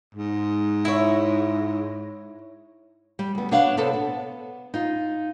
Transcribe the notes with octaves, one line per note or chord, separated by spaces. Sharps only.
G#2
E4 C#5
G3
D2 B3
B2 D4 C#5 F5 F#5
C3 B3 A4 C5
B3
D#4 F4